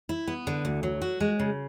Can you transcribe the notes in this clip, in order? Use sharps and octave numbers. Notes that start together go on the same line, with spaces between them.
E4
B3
D3
D2
F#3
F#4
G#3
C#3